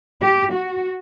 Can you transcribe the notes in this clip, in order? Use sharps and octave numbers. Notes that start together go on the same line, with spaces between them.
G4
F#4